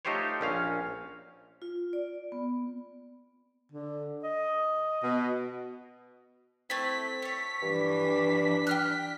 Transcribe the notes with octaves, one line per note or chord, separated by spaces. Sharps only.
A3 D#4 F4 G4 C5 C#5
A#1 C#4 F5
F4
D5
B3
D3
D#5
B2
A3 C4 E4 B6
A3 C#5
G2 E3 D4
G5 F6 F#6